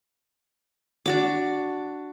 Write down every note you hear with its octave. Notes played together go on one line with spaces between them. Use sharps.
D4 F#4 D6